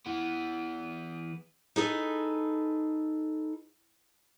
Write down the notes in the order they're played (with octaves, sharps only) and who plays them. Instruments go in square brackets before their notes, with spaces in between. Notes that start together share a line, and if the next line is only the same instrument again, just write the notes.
[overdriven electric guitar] E3 B3
[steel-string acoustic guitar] D#4 G#4 A4 B4